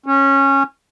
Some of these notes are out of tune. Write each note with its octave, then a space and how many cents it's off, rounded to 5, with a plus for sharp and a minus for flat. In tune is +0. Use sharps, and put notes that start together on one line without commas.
C#4 -15